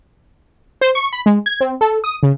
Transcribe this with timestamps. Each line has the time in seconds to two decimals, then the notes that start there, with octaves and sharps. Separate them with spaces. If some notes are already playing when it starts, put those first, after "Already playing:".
0.81 C5
0.95 C#6
1.13 B5
1.26 G#3
1.46 G#6
1.61 C4
1.81 A4
2.04 D#6
2.23 C#3